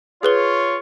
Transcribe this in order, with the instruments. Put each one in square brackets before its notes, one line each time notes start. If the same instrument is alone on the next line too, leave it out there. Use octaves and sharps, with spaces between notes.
[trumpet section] F4 C#5 [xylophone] G#4 B4 G7